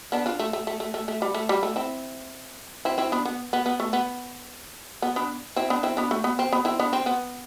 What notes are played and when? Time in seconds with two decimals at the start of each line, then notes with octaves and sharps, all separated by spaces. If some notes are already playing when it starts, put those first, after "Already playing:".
0.12 B3 D4
0.26 D4 F4
0.39 A3
0.53 A3
0.67 A3
0.80 A3
0.94 A3
1.08 A3
1.22 G3
1.34 A3
1.49 G3
1.63 A3
1.76 C4 E4
2.85 C4 E4
2.98 C4 E4
3.12 B3 D4
3.25 B3
3.53 B3
3.66 B3
3.80 A3
3.93 B3
5.02 B3
5.16 B3 D4
5.56 C4 E4
5.70 B3 D4
5.83 C4 E4
5.97 B3 D4
6.11 A3
6.24 B3
6.39 C4
6.52 B3
6.65 C4 E4
6.80 B3 D4
6.93 C4
7.06 B3